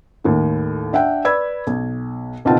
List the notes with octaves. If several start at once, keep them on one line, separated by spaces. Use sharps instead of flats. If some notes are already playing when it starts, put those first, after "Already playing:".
D#2 A2 D#3
D4 E5 F#5 G5
B4 D5 B5 E6 G#6
B1
C#2 B2 D#3 C4 F4 A5